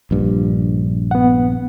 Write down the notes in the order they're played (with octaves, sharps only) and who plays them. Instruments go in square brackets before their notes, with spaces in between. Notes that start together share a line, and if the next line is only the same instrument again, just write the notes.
[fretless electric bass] A#1 G2
[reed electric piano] B3 F#5